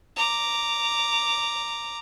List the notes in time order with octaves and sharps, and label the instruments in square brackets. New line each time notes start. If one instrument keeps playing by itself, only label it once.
[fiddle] A#5 D6